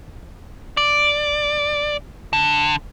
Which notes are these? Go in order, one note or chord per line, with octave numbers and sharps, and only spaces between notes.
D5
D3